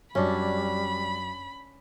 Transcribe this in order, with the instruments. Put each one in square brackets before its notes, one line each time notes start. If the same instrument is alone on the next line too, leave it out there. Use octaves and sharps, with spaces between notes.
[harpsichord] F#2 [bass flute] G3 [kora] C#4 D4 [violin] B5